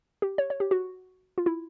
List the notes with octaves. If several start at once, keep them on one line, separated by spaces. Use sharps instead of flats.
G4
C#5
C#5
G4
F#4
F4
E4